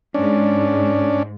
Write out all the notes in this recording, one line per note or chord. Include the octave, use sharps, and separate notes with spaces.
G#2 C#4 D4